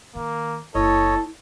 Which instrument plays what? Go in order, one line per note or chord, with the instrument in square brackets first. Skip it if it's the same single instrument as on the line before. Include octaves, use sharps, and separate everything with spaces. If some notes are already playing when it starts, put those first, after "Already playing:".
[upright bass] D#3 [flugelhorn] A#3
[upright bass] F#1 [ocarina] E4 [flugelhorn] A4 [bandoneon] C#5 D#5